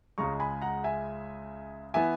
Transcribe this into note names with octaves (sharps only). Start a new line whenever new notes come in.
C#2 C#3 G#3 A#5 C#6
G#5 B5
F#5 A#5
E5 G#5
E3 B3 E5 G#5